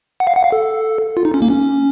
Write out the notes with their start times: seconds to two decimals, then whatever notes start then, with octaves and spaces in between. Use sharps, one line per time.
0.20 F#5
0.27 F5
0.36 F#5
0.44 F5
0.52 A4
1.17 F4
1.25 D#4
1.34 C#4
1.42 A#3
1.50 C#4